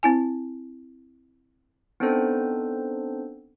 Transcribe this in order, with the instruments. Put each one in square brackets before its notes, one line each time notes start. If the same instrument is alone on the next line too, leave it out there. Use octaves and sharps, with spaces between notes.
[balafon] C4 E4 G#5
[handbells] B3 C4 D4 D#4 A4 C5